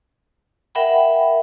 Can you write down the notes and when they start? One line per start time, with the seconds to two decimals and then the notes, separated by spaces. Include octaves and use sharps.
0.75 A#4 E5 F#5 G5 B5